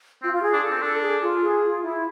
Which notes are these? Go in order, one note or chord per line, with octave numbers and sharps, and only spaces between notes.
C4 F4
F4
G#4
D4
A4
C4
D4 A4
G#4
G#4
F4
G#4
F4
E4